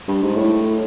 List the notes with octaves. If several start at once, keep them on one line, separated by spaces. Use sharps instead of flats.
G2
G#2
A2